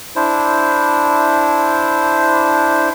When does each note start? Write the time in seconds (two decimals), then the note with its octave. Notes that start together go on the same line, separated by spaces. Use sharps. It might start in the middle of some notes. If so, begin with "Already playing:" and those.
0.16 D4 E4 C5